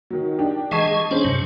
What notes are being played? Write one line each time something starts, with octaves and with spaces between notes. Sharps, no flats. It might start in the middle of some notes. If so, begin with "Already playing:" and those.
D#3 F#3
D4 G4
E3 G#3 G#4 D#5 A5 C#6
G#4
C#4 D4 G#4 C5
G2 C3 F#3